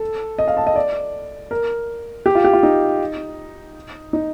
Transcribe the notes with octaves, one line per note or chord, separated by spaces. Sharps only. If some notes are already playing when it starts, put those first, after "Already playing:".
Already playing: A4
D#5
F5
A5
D#5
D5
A#4
G4
F4
G4
F4
D#4
D#4